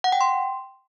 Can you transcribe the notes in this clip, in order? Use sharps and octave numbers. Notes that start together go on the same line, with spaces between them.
F#5
G5
C6